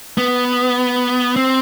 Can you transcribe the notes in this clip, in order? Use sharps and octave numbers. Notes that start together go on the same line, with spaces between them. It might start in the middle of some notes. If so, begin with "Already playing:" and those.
B3
C4